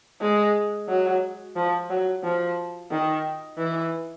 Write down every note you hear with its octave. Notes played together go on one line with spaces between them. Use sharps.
G#3
F#3
F3
F#3
F3
D#3
E3